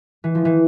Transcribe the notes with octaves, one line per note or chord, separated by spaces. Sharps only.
E3
F3
E3